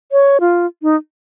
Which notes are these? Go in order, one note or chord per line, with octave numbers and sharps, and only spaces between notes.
C#5
F4
D#4